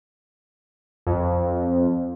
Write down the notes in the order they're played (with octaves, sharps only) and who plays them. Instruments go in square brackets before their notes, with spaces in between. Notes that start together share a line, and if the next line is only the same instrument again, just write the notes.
[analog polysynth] F2